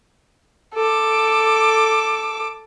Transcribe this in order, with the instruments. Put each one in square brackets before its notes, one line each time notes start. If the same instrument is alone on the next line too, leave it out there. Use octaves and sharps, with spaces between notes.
[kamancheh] A4 D6